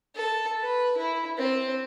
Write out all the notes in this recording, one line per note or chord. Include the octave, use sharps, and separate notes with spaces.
A4
B4
E4
C4